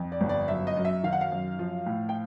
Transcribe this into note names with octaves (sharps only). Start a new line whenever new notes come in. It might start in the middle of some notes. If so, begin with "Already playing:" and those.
Already playing: F2
D5
G1
D5
F#2 E5
D#5
F#2
E5
D#3 F5
F#5
F5
F#2
F3
A2
G5